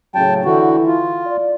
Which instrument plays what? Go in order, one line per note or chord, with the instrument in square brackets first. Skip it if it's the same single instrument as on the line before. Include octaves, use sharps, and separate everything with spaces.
[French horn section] A2 C#3 F#3 [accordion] G5 A5
[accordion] D3 F#4 [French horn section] E3 E4
[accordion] F4
[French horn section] D5